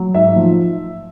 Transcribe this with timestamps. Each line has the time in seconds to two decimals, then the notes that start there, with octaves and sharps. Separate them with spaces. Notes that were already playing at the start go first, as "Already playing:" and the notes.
Already playing: F#3
0.14 G#2 E5
0.36 F3